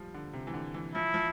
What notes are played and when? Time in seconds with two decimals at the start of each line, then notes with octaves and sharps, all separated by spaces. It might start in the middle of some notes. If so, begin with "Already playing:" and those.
Already playing: F3 G3
0.14 D3
0.33 C3
0.47 E3
0.54 D3
0.74 E3
0.95 F3 E4
1.14 F3